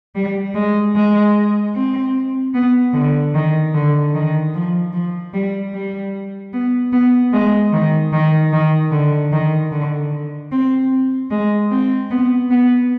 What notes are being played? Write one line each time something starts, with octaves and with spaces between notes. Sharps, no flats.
G3
G#3
G#3
C4
B3
D3
D#3
D3
D#3
F3
F3
G3
G3
B3
B3
G#3
D#3
D#3
D#3
D3
D#3
D3
C4
G#3
C4
B3
B3